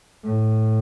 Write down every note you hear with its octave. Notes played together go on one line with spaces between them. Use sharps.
A2